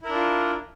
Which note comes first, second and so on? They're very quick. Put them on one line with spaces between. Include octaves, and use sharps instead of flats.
E4 A#4 D4 F4